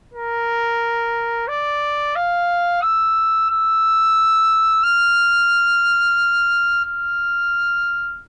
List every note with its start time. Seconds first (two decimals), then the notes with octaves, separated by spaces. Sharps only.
0.14 A#4
1.48 D5
2.16 F5
2.82 E6
3.50 E6
4.83 F6
6.85 F6